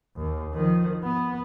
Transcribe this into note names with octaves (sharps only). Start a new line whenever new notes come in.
D#2
D#3 F3
B3